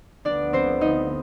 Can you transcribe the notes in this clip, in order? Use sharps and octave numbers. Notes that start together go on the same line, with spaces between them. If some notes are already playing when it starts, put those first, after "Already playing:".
D2 D3 F3 B3 D4 D5
C4 C5
D#4 D#5